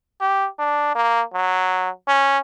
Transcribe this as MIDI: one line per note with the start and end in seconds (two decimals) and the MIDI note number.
0.21 0.47 67
0.59 0.93 62
0.95 1.22 58
1.34 1.90 54
2.08 2.39 61